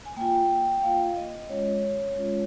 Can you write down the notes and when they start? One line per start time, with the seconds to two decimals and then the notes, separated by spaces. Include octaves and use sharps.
0.06 G#5
0.16 A#3 F4 G5
0.77 G5
0.82 A#3 F4 F5
1.17 D#5
1.49 G#3 C#4 F4 C#5
2.15 G#3 C#4 F4